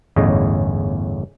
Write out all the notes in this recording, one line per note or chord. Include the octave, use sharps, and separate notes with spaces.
G1 E2 A2 C#4 G#4 D#5